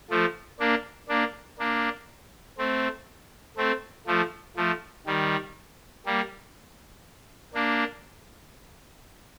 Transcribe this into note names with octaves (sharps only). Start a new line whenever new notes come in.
F3 A3
A#3 D4
A#3 D4
A#3 D4
A3 C4
A3 C4
F3 A3
F3 A3
D#3 G3
G3 A#3
A#3 D4